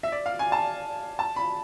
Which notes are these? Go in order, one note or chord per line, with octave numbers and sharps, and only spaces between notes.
E5
D5
F5
G#5
A5
A5
B5